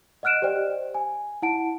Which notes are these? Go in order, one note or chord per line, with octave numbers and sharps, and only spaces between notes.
D#5 F#5 F6 F#6 D7 E7
G4 C5 D5 D#5 G5
G#5
E4 F#5 A5 D7